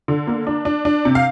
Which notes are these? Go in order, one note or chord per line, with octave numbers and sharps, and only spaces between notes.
D3
A#3
D4
D4
D4
C3
F5